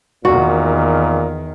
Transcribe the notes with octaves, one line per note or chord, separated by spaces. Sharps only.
E2 A#2 D#3 F#4